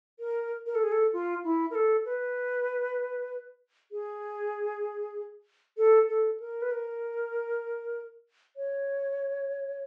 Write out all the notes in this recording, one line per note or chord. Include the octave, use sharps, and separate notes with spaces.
A#4
A#4
A4
G#4
A4
F4
E4
A#4
A4
B4
G#4
A4
A4
A#4
B4
A#4
C#5